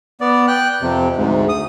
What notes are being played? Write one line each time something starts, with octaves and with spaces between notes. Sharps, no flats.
B3 D5
G5 F#6
F2 C3
D2 G#2
D#6